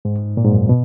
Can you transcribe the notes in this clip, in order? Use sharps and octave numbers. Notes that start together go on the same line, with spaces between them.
G#2
A#2
G#2
F#2
B2